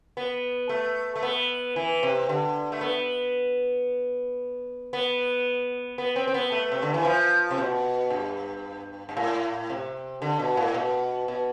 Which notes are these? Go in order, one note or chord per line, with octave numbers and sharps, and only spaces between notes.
B3
A3
A3
B3
E3
C3
D3
A3
B3
B3
B3
C4
C4
B3
A3
C3
D3
E3
F3
C3
B2
G2
G2
A2
C3
D3
B2
A2
B2
B2